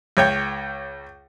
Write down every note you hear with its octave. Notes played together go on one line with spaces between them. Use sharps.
C#2 C#5 G5